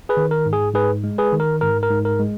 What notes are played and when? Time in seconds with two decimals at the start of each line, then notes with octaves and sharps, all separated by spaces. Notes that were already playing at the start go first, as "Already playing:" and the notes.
0.09 G#4 B4
0.17 D#3
0.31 A#4
0.46 G#2
0.53 G#4
0.74 G#2 G#4 B4
1.04 G#3
1.18 G#4 B4
1.33 D#3
1.40 A#4
1.61 G#2 A#4
1.83 A#4
1.90 G#2
2.05 A#4
2.20 G#3